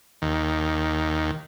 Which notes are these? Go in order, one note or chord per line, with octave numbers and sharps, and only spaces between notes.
D#2